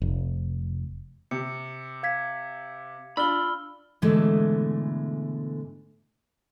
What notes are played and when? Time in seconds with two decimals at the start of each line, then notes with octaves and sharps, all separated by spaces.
0.02 F1
1.31 C3 C#7
2.03 F5 G#6 B6
3.17 D4 F4 B5 E6 F6 G7
4.02 G#2 B2 D3 E3 G#3 A3